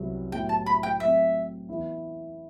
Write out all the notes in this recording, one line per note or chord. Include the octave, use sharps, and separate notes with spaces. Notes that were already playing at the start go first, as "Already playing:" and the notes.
Already playing: C2 C3 F#3 B3
A2 F#3 B3 E4 G4 G5
A5
B5
G5
F#3 A3 C4 E5
E3 B3 E4